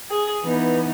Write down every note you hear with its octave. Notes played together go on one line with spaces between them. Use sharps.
G#4
E3 B3 D#4